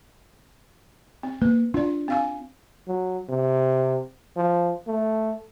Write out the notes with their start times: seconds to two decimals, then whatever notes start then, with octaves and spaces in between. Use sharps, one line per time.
1.23 C4
1.42 A#3 B4
1.74 D4 F4 D5
2.08 C4 F5 G#5
2.88 F#3
3.29 C3
4.36 F3
4.87 A3